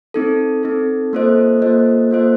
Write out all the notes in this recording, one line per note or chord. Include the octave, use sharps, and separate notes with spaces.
C4 D#4 A4
C4 D#4 A4
A#3 F4 A4 C5 D#5
A#3 F4 A4 C5 D#5
A#3 F4 A4 C5 D#5